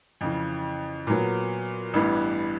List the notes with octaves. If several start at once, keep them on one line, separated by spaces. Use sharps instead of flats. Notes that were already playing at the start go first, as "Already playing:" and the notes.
F2 C#3 E3
A#2 F#3 B3
A1 G2 E3 G3 B3